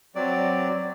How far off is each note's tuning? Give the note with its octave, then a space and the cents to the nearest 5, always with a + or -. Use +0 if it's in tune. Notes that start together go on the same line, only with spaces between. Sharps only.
F#3 +0 C4 +0 D5 +0